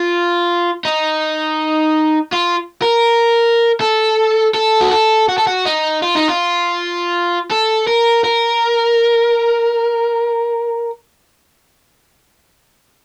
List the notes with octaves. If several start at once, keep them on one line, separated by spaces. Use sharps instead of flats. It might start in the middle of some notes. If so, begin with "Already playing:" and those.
Already playing: F4
D#4
F4
A#4
A4
A4
F#4
A4
F#4
A4
F#4
D#4
F4
D#4
F4
A4
A#4
A#4